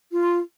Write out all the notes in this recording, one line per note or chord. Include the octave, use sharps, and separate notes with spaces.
F4